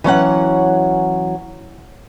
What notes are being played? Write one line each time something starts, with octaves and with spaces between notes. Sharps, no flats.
E3 F#3 C#4 F#5